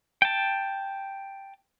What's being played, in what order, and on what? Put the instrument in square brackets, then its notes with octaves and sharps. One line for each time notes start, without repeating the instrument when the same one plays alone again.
[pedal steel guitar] G5 A5